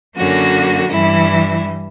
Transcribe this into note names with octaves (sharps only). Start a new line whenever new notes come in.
F#2 D3 A#3 C#4 F#4
G2 E3 G3 E4